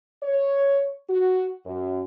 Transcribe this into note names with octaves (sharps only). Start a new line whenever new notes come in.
C#5
F#4
F#2